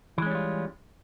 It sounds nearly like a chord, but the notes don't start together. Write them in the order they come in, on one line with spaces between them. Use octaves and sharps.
E3 G#3 C#4 G3 F4